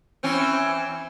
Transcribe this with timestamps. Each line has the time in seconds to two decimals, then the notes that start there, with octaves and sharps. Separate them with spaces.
0.23 E3 C4 C#4